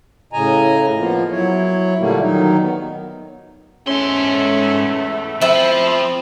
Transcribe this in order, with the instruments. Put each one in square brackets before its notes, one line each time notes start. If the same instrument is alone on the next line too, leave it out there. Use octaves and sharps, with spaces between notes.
[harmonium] A2 C#3 D#5 G#5 A#5
F3 A#3 B3 F4
F#3 E4 C#5
A#2 D3 G3 A3 A#3
D#3 F#3 D#4
B3
[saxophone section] E2 A3 [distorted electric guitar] G#2 C6 [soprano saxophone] C#4
[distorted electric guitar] F3 [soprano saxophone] C4 [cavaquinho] E5 B5